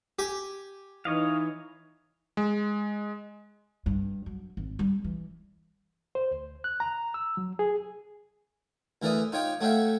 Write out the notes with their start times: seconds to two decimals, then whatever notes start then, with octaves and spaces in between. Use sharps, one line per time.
0.19 G4 G#5
1.05 E3 D#4 C#5 D#5 F5
2.37 G#3
3.86 G2
4.26 F#3
4.57 G#1
4.79 G3
5.04 E3
6.15 C5
6.31 D2
6.64 F#6
6.80 A#5
7.14 E6
7.37 F#3
7.59 G#4
9.02 D2 E3 A#4 D5 E5 D#6
9.32 D#4 F4 C#5 G5 D6
9.61 A3 F#4 C#5 E5 F5 G5